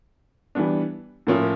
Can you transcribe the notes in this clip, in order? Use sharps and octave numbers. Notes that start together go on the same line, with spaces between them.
E3 G3 B3 D4
A2 F3 A#3 C#4 E4